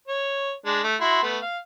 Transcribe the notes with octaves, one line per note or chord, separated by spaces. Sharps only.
C#5
G#3 D4
A3
E4 F#4 C6
A3 B3
F5